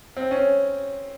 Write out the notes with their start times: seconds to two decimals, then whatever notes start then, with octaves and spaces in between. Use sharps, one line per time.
0.17 C4
0.31 C#4